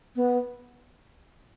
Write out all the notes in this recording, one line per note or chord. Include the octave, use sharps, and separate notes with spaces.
B3